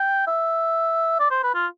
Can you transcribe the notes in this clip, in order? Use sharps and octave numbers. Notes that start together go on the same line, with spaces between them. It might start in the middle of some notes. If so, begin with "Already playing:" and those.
Already playing: G5
E5
D5
C5
B4
F4